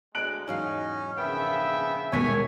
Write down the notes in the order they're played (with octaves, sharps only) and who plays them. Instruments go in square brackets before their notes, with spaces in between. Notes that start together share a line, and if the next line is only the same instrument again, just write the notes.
[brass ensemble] D2 G#3 [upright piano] F#6 D7 F#7
[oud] E2 G#2 F5 [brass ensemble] F#3 D#4 [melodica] C#4
[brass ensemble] A#1 C#3 E5 [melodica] B3 G5
[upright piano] D#1 B2 B6 [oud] D#3 G#3 A#3 [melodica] C#5 G#5